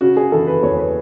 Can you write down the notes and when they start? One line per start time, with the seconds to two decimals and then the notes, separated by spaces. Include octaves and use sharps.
0.01 C#3 F#4
0.17 G#4
0.32 E3 A4
0.47 B4
0.63 E2 C#5
0.79 B4